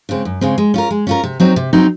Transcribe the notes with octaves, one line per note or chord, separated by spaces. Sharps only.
C#3 G#3 C4
F#2
C#3 G#3 C4
G#3
C#4 F4 A#4
G#3
C#4 F4 A#4
C3
F#3 C4 D#4
C3
F#3 C4 D#4